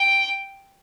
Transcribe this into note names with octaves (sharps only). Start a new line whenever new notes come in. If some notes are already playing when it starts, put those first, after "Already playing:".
Already playing: G5